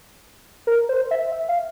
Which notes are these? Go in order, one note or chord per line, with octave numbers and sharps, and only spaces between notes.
A#4
C5
E5
E5
F5